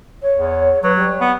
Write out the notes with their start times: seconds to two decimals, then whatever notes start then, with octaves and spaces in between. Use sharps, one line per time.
0.22 C#5
0.35 E2
0.83 F#3 B4
0.96 G3
1.21 B3